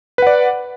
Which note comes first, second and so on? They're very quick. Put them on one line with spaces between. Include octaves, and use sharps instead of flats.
B4 F#5 D5